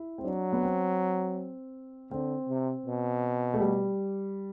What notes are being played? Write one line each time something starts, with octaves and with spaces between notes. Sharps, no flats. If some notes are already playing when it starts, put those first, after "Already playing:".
Already playing: E4
C4
F#3 D4
B3
C4
D3 C4
C3
B2
A3
G3